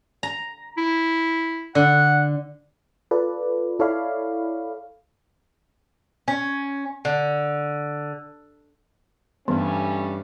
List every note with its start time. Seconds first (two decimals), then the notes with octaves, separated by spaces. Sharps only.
0.23 A#5
0.77 E4
1.75 D3 F#5
3.11 F4 A4 B4 D5
3.79 E4 A4 C#5 D5 F5 B5
6.28 C#4
7.05 D3
9.48 G2 E3 G3 A3 C#4